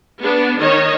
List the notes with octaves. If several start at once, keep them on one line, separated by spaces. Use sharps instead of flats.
B3 D4
D#3 C#5 D#5